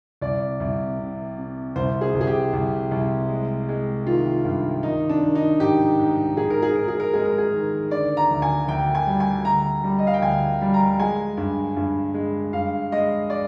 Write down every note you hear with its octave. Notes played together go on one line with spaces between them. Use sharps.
C2 D5
C2
C3
C3
C2 C5
G#4
C2
G#4
G4
C2
C2
G#3
G#3
D#3 F4
G2
D#3 D#4
D4
D#3
D#4
G#2 G4
G#2
G#2 G#4
A#4
G#4
G#2 A#4
G#4
A#4
G#3 G#4
A#4
G#4
D#3
D3 D5
A#5
D2
G#5
D2 G5
G#5
G3
G#5
D2 A#5
G3
D#5
F5
G5
D2 G#5
G3
A#5
G#3 G#5
G2
G2
G#3
G2 F5
G#3 D#5
D5